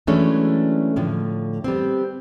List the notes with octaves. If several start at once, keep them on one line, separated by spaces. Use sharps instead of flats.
E3 F#3 G#3 A3 C#4 D4
A2 D3 F3
G3 B3 C4